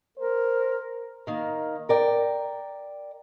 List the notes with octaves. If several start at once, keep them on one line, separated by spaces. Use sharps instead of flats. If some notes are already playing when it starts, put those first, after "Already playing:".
A#4 C5
D#3 A#3
A#4 D5 G5